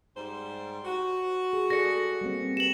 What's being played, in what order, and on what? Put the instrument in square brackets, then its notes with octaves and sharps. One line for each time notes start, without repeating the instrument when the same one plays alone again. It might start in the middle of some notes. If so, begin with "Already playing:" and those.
[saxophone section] G#2 G3 C5
F#4
[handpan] G#4
[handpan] G#4 A4 D5 [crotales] A#6 C#7
[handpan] G3 A#3 C4
[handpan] G4 B4 [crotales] E7 F#7